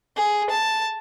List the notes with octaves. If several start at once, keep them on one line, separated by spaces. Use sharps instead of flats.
G#4
A5